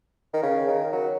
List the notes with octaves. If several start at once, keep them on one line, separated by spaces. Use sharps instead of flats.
D#3
C#3
D#3
F#3